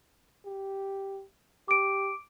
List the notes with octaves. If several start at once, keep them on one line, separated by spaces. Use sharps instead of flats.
G4
G4 D6 D7